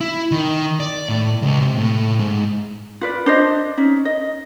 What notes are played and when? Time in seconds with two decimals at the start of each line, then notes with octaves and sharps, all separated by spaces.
0.01 E4
0.31 D#3
0.80 D5
1.09 A2
1.42 C#2
1.61 C3
1.78 A2
2.19 G#2
3.01 F4 B4 D5
3.26 D4 C5 D#5
3.77 C#4 D#4
4.05 D#5